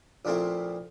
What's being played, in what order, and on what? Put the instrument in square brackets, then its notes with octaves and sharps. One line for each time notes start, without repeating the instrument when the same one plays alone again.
[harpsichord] A#1 A#2 A3 C4 E4